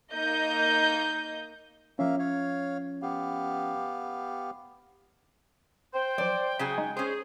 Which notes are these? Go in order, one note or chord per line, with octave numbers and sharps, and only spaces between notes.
A#3 D#4 D#5 G6
F3 A#3 C#4 E5 F5
C#5 F5
B3 G4 F5
C5 G5
F3 F#3 D5
C#3 F#3 G#4 B6
G#3 D#4
C#4 G#4 C5